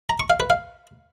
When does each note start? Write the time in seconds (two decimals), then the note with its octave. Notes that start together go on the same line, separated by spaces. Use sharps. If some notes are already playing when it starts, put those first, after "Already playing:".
0.09 A#5
0.20 C#6
0.30 F5
0.40 B4
0.50 F5